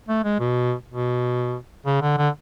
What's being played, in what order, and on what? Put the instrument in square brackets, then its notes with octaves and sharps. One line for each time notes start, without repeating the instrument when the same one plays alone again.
[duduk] A3
G#3
B2
B2
C#3
D3
D3